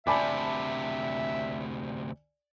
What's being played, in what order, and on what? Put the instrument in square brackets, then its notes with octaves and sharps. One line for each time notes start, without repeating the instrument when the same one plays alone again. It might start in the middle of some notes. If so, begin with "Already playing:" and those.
[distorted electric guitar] D2 C3 [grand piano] D5 G#5 [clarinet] E5 [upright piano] A5 B5 D6